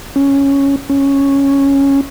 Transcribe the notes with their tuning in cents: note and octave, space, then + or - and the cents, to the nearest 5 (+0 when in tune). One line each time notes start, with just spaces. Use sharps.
C#4 +0
C#4 -5